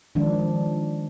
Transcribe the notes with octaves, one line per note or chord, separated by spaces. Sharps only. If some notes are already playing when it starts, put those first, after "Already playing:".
D#3 F3 G#3 D4